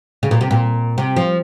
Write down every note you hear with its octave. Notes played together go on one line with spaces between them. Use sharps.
C#3
A#2
C3
A#2
C3
F3